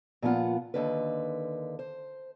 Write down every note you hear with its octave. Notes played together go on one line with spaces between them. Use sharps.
A#2 F3 B3 F4 F#5
D#2 D3 B4
C5